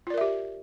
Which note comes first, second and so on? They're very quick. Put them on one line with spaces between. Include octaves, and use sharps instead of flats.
F4 D5 A#4 E5 G4